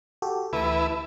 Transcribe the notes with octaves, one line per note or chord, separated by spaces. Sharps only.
F#4 G4 A4
D2 E3 E4 B4 A5